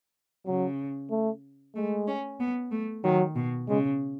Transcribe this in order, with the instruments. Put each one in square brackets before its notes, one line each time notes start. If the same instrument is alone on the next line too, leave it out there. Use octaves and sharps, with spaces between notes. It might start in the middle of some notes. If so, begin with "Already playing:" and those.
[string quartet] C#3 [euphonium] F#3
[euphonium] A3
[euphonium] G#3 [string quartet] A3
[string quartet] C#4
B3
A3
[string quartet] D#3 [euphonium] F#3
[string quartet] B2
[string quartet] C#3 [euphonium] G#3